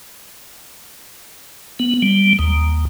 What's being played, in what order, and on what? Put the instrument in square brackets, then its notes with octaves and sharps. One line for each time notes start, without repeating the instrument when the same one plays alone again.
[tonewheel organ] B3
G3
D#2